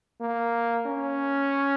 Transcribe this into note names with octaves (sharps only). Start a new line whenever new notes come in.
A#3
C#4